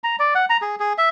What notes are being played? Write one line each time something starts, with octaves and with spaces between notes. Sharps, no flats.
A#5
D5
F#5
A#5
G#4
G#4
E5